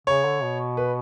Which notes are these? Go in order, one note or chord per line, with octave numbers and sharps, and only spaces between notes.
C#3 C#5
D3
B2
B4